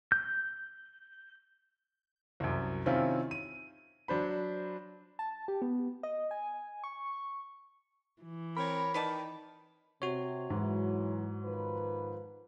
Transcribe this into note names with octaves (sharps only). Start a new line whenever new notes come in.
G6
C2 F#2
C3 D#3 C4 C#4 E4 F4
D#7
F#3 D4 C5 B5
A5
G4
B3
D#5
G#5
C#6
E3
C4 A#4 C#5 B5
D#3 B4 D5 A5
C3 F#4 C#5
G#2 E3 F#3
D#3 F3 B4